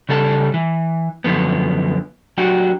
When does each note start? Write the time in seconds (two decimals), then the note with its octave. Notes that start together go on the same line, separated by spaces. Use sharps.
0.09 C#3 G3 A4 E5 A5
0.54 E3
1.24 F#2 B2 D3 F3 B3
2.38 F#3 D4 F#4 G4